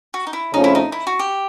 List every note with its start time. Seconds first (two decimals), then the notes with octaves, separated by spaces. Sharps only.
0.14 F#4
0.27 D#4
0.33 E4
0.53 F2 C#3 F3 A3 C#4 D#4
0.64 E4
0.75 D#4
0.92 E4
1.07 F#4
1.19 G4